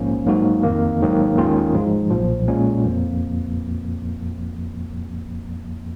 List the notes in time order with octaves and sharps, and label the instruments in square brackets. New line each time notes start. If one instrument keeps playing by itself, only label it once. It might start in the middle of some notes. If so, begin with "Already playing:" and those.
Already playing: [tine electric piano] A#1 G#2 F3 A#3 C#4
G#2 F#3 A#3 D#4 F#4
F2 D#3 A#3
G#1 G#2 D#3 F#3 A#3
D#2 D#3 G#3 C#4 F4
G#2 F3 G#3 D#4
B1 A#2 F3
A#2 G#3 C#4
F2 F3 A#3